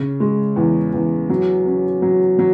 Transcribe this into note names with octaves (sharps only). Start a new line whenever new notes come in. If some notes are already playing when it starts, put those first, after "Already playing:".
Already playing: C#3
G#3
E2
E2
F#3
C#4
F#3
F#3